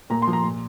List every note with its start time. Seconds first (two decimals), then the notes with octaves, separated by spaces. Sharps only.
0.10 A#2 A#5
0.22 C6
0.27 F3
0.33 A#5
0.44 A#2